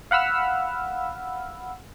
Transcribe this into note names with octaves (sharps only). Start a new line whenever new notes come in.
F5 F#5 B5 E6 F6